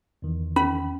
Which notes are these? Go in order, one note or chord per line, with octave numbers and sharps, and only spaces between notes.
E2 D#3 E3
C#4 B5